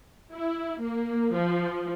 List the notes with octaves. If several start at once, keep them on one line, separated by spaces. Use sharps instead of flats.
E4
A#3
F3